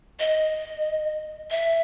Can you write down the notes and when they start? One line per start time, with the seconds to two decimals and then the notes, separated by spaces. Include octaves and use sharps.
0.20 D#5
1.51 E5